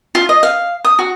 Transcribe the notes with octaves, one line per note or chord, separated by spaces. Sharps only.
F4
D#5
F5
D#6
F#4